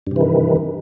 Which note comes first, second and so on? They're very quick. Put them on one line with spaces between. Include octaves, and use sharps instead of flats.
G2 C3 E3 D#3